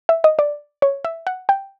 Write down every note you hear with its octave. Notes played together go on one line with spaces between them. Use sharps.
E5
D#5
D5
C#5
E5
F#5
G5